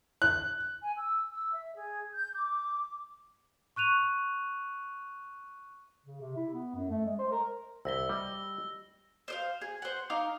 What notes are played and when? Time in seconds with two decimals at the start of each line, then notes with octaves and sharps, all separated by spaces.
0.22 F#6
0.82 G#5
0.97 E6
1.31 E6
1.53 E5
1.74 G#4
2.14 G6
2.34 D6
3.76 C#6 F#6 D#7 F7
6.06 C#3
6.20 C3
6.36 E4
6.54 B3
6.75 F#2
6.90 A3
7.06 G#3
7.19 C5
7.32 A#4
7.85 C2 E5 E6 A#6 G7
8.09 G3 D#5
9.28 C5 D#5 F5
9.61 G#4
9.82 C5 F#5
10.10 D#4 F5 D6